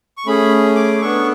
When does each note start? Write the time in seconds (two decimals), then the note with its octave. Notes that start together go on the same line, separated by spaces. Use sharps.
0.17 C#6
0.26 A3 C#4 G#4 B5
0.76 D6
1.01 B3 D4 A4 C#6